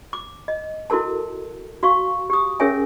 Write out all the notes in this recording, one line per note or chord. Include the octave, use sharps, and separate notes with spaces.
D6
D#5
E4 F#4 A4 A#4 A5
F#4 F5 C#6
G4 D#6
C#4 G#4 A#4 C#5 E5 G#5